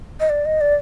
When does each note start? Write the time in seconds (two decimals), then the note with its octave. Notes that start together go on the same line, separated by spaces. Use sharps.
0.20 D#5
0.30 D5
0.45 D#5
0.61 D5